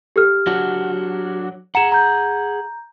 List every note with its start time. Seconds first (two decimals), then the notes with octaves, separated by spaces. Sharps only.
0.16 G4 A4 F6
0.47 F#3 D4 F#4
1.75 G#4 F#5 A#5 C#7 E7
1.92 A#5 G6